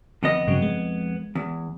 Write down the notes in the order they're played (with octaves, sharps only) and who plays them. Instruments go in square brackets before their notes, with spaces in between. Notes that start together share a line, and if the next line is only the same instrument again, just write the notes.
[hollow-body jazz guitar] F2 B3 D#5 [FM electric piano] D3
[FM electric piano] G2 C#3 F#3
G#3
[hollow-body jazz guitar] E2